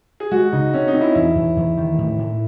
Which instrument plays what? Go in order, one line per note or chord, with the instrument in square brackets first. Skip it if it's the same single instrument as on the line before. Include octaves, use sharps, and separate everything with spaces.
[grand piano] G#4
[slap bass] G#3 [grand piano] F#4
[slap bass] C#3 [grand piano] D#4
[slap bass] C4 [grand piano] C#4
[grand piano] D#4
[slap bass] C4
[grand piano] E4
[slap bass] E2 [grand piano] E4
[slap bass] E2
E2
D#3
A2
A2